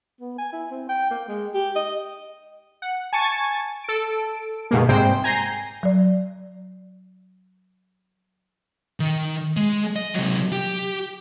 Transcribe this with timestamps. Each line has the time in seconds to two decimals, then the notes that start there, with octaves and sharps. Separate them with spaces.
0.20 B3
0.38 G#5
0.53 E4
0.70 C4
0.89 G5
1.10 A#3
1.28 G#3
1.54 G4
1.75 D#5
2.82 F#5
3.13 G#5 A5 C#6 A6
3.84 A4 D7
4.71 G2 B2 D#3 G#3 A#3
4.89 G#2 C3 G3 G#3 C5 G5
5.24 G#5 A#5 G6 A#6 C7
5.83 F#3 D5
9.00 D#3
9.57 G#3
9.96 D#5
10.14 C3 F#3
10.53 G4